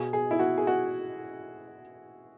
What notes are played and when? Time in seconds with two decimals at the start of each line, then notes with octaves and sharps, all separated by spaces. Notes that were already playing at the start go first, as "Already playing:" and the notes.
Already playing: B2 G#4
0.13 G#4
0.31 E4
0.39 F#4
0.58 G#4
0.67 F#4